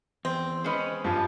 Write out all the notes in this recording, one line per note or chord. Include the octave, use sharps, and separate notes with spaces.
E2 C4
G#3 C#4 B4 C5 D#5
G2 F3 F4